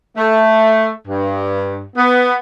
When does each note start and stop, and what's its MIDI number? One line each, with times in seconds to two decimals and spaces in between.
0.16 0.90 57
1.07 1.84 43
1.96 2.35 59